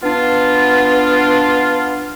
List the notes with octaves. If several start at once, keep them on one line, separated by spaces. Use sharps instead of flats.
B3 D4 F4